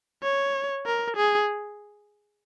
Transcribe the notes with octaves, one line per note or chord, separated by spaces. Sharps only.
C#5
A#4
G#4